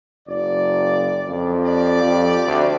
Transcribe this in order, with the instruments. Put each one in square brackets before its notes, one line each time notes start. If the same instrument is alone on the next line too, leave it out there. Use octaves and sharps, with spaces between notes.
[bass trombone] F#1 [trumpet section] D5
[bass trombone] F2
[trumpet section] G4 D5
[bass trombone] F2
D2